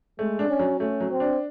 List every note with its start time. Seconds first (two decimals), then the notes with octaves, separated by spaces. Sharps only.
0.19 G#3 A3
0.39 D4
0.49 C#4
0.59 F#3
0.80 A3 C#4
1.00 F#3
1.11 C4
1.20 D4